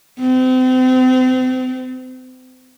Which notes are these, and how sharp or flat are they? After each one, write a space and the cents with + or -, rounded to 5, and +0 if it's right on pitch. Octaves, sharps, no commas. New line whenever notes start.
C4 -35